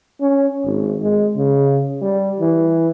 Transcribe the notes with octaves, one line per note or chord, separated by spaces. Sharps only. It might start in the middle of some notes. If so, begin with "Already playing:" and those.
C#4
G#1
G#3
C#3
G3
E3